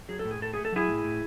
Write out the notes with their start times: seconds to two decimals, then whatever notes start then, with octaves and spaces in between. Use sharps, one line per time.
0.09 F#3 G#4
0.19 A4
0.25 A2
0.31 G#4
0.40 A2 A4
0.54 A3 G#4
0.65 A4
0.72 F#3 E4 G#4
0.88 A2
1.04 A2